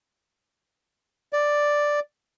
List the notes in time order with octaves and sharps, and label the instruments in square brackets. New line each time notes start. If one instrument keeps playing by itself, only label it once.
[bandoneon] D5